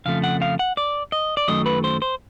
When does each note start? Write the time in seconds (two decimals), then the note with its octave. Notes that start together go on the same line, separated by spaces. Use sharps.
0.05 F2 C#3 F3 A3 F5
0.24 F#5
0.42 F5
0.59 F#5
0.77 D5
1.12 D#5
1.37 D5
1.48 F#2 D#3 F#3 A3 D#5
1.66 B4
1.84 C5
2.02 C5